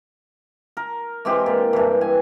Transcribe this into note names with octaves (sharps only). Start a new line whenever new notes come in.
A#4
E3 G#3 C4 G4
A#2
G2 E3
G#5